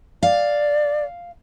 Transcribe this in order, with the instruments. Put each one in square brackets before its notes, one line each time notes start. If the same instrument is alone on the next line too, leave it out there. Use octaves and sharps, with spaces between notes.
[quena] D5 [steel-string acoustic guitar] F5